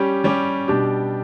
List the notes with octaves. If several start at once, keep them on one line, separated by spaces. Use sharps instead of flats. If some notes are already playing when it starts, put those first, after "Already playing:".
Already playing: G3 C#4 G4
G3 C#4 G4
B2 G3 D4 G4